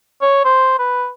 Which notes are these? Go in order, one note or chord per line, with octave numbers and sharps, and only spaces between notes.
C#5
C5
B4